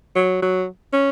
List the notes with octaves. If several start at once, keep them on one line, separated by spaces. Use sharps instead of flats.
F#3
F#3
C#4